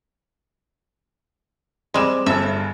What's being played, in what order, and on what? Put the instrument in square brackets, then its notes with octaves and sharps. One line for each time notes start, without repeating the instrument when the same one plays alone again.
[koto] G3 G#3 [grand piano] C4 E7
[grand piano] G1 G2 [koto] E5